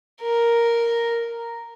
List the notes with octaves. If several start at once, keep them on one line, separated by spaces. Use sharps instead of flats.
A#4